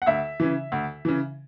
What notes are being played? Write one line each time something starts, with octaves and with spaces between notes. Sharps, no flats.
F#5
D2 E5
C#3 E3
D2
C#3 E3